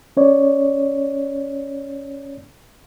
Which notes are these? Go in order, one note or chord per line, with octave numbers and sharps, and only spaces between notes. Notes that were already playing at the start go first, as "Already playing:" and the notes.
C#4 C#5 D5